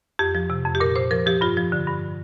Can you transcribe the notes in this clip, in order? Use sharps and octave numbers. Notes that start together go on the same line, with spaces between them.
F2 G4
F3
C3
F2
G4
A#2 A#4
A#2 C5
F3 A#4
F3 G4
G2 F4
F3
D3
G2